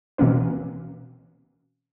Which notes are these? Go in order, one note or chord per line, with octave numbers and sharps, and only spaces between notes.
B2 E3 A#3 C4 C#4 B4